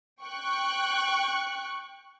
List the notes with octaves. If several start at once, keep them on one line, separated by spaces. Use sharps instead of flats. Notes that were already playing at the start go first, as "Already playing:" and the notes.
G5 C#6 F#6